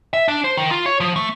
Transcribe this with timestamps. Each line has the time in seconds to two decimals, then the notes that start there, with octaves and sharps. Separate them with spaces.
0.13 E5
0.28 D4
0.44 C5
0.57 D#3
0.71 F4
0.86 C#5
1.00 F3
1.16 A3